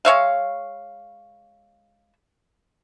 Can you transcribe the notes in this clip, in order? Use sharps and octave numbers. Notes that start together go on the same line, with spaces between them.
G#3 C#5 E5 F5